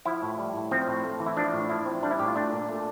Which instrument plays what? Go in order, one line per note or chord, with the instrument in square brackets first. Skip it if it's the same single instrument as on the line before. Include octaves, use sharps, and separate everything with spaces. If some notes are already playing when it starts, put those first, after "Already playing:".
[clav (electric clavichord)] F3 E4
A2
G3
A2
F3 C4
A2
A3
E3
E4
F3 D4
A2
F3 E4
C4
G3 D4
E4
A2 G4
F4
A3 D4
A#2
A3